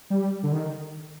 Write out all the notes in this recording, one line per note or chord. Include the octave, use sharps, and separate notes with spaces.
G3
D3
D#3